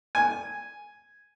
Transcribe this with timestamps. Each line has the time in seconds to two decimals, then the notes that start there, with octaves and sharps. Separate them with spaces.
0.15 G#5